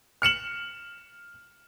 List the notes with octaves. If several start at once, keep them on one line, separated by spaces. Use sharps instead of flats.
F6 C#7 E7 F#7